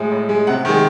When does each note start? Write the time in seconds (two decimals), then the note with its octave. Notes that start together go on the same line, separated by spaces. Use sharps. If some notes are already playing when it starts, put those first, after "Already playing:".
Already playing: A2 G#3
0.11 A2
0.29 G#3
0.47 C3 F#5
0.65 D#3 G#3